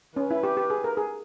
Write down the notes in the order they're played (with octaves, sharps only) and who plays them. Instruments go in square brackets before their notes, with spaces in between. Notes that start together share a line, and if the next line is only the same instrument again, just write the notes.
[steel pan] C#4 [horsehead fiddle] B4
[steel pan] E4
G4
G4
G#4
A#4
G#4